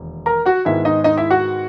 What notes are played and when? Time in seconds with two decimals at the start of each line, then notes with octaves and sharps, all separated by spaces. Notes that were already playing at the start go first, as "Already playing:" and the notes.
Already playing: E1 D#2
0.26 A#4 A#5
0.46 F#4 F#5
0.65 G#2 D#3 G#3 B3 E4 E5
0.85 D#4 D#5
1.04 D#4 D#5
1.17 E4 E5
1.30 F#4 F#5